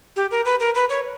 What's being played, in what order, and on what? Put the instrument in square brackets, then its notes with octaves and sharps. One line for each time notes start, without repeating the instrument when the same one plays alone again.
[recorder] G4
A#4
B4
A#4
B4
C#5